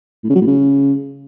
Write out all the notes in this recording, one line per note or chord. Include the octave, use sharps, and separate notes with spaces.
A2
C#3
F#3
A2
C#3